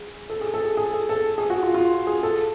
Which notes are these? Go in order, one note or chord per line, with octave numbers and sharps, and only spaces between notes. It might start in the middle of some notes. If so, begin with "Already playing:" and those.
Already playing: G#4
A4
G#4
A4
G#4
G#4
A4
A4
G#4
F#4
F4
F4
G#4
A4